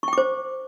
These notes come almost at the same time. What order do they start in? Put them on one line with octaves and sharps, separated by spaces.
C#6 G5 D6 C5